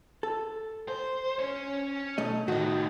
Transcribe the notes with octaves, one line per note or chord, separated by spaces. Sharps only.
A4
C5
C#4 C#5
B1 A3 D#5
A2 D#3 F#4 D#5